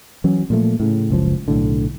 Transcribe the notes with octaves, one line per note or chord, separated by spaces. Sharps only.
E3 F#3 C#4
A#2 F3 A3
A2 C#3
F#1 C#2 F3
B1 A2 D3